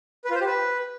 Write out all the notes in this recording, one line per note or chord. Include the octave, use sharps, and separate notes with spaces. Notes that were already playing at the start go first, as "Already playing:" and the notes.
B4
F4
C5
G4
B4